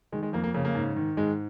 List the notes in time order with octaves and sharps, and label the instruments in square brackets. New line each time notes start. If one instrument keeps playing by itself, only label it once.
[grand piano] D#3 G#3
G#3
F2 A#3
A#3
C#3 A#3
A#3
G#2
D#3
G#2 G#3